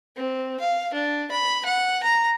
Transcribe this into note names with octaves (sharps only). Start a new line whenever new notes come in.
C4
F5
D4
B5
F#5
A#5